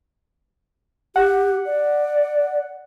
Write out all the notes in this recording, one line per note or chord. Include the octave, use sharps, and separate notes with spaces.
G4 F#5
D5